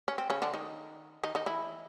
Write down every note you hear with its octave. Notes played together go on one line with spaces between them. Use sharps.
C#4
C4
C#3 C#4
D3 D4
D#3 D#4
D#3 D#4
D#3 D#4
E3 E4